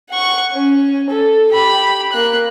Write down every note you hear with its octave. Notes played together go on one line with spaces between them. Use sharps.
F#5 C#6
C#4
A4
G4 B5
A#3 F#6